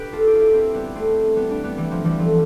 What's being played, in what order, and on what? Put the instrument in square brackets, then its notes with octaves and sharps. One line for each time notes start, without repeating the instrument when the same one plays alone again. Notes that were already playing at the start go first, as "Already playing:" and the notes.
Already playing: [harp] D4 G4 B4
F4 A4
E4 G4
F4
E4 G4
C4 E4
G3 B3
A3 C4
G3 B3
B3 D4
G3 B3
E3 G3
F3
E3 G3
F3 A3